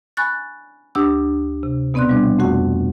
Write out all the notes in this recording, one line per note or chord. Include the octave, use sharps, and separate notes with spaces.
G#5 B5 C#6 F#6 A6
D2 D4 G4 D#6 E6
C3
B2 B3 C4 D5 C6 F#6
G3 D4
F2 A3 C4 F#4 F#5 C#6